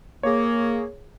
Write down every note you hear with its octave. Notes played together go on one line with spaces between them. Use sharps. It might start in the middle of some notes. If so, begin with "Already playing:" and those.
A#3 G#4 C#5